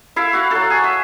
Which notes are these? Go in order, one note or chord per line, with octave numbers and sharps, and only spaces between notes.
E4 E5 F5
F#4 F5 F#5
F#3 A4
G#4
E5